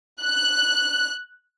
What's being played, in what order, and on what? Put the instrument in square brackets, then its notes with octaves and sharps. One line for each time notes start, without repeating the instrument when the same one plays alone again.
[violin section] F#6